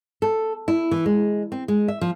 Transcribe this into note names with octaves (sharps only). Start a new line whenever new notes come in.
A4
E4
E3
G#3
C4
G#3
E5
F3